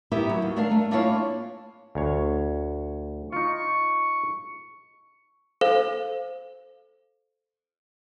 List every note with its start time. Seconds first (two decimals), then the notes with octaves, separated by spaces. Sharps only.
0.12 B3 E4 G4 A#4 E5
0.29 F#3
0.42 D#2
0.56 A3 D4 A#4 F5
0.71 A3
0.91 A#3 D4 E4 F4 G#4 C#5
1.95 D2 C#5
3.32 D#4 F4 C#6
5.61 A4 C5 F5